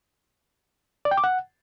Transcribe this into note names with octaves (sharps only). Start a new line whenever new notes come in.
D5
G5
D6
F#5